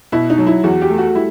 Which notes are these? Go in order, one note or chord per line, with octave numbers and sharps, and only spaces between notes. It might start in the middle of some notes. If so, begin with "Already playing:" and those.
B2 E4
D#4
F#3
E4
E2 F#4
G4
A3
F#4
G3 E4